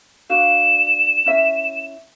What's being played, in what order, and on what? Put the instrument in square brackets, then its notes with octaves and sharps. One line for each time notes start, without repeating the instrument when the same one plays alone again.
[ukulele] D4 F#4 F5 [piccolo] E7
[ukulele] C#4 E4 E5